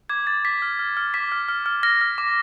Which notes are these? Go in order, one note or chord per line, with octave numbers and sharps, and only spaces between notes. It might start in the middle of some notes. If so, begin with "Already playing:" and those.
D6 G#6
D6 A6
D6 B6
F6
F6
F6
D6 B6
F6
F6
F6
F6 A#6
F6
D6